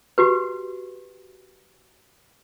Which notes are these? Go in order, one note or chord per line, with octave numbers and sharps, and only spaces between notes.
F#4 G4 B4